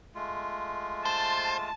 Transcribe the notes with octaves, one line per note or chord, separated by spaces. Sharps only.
G#3 A3 F4
C5 A5